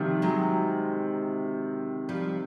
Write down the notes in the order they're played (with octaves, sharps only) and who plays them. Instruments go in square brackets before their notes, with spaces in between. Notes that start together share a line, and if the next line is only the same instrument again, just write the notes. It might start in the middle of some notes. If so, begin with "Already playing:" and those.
Already playing: [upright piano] C3 D#3 [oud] F3 G3
[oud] F#3 G#3
F3 G3